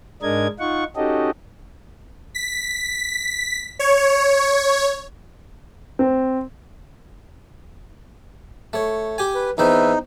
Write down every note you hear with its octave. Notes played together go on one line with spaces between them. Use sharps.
G#2 G#3 D4 A#4 D#5 G#6
D#4 F4 F#5 C#6
C#4 D#4 F#4 G4 A4 D#5
B6
C#5
C4
A3 C#5
G4 G#5
B4
E2 C4 D#4 B4 C5 E5